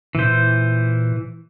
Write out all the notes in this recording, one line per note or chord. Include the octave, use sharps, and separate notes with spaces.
A#2 E3 C5